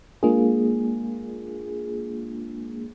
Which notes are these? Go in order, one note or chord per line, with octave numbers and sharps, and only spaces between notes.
G#3 A#3 D4 F4 G#4